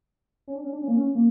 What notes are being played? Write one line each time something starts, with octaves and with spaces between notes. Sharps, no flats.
C#4
D4
C#4
D4
C#4
A#3
C#4
A#3